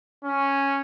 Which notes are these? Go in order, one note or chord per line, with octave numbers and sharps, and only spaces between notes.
C#4